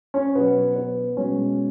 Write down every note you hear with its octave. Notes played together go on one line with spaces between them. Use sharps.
C#4
B2 F#3 B3
B3
B2 G#3 C#4